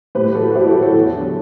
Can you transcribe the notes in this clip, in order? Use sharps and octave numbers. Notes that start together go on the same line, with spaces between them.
A2 G4 B4
E3 F#4 A4
F#4
A2 E4 G4
F#4 A4
E3
A4 C#5
E2
D3 F#3